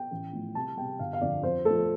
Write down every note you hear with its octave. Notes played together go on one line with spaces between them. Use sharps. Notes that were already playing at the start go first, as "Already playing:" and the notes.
Already playing: G5
A1
A2 F3
C2 A5
C3 G3 G5
G1 F5
F5
F2 D3 D5
F2 C5
A3 A4
F3